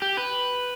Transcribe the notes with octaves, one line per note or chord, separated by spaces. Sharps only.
G4
B4